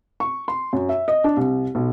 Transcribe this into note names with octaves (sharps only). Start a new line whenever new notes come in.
C#6
C6
F#2
E5
D#5
D4
C2
B1